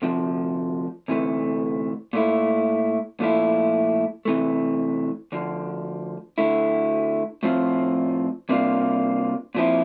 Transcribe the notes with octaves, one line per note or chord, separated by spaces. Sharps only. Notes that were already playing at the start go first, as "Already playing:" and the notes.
D2 C3 F3
D2 C3 E3 A3
A#2 A3 E4
A#2 F3 A3 E4
C3 E3 A3
D2 D3 F3
D2 D3 A3 E4
A2 F3 C4 F4
C3 G3 A#3 D4 F4
A#2 F3 C4 E4